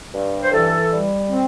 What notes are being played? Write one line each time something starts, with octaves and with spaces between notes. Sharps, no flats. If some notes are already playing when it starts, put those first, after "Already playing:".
G2
C5
E3 A4
G3
C4